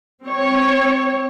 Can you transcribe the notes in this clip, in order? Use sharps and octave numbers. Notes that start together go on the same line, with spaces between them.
C4 C#5